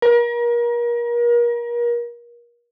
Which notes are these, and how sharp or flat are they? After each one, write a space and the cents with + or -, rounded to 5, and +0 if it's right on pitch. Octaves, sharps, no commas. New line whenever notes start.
A#4 +35